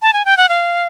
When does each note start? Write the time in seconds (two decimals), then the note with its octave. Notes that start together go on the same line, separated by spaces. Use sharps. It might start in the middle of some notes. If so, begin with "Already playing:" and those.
0.02 A5
0.13 G#5
0.25 G5
0.37 F#5
0.49 F5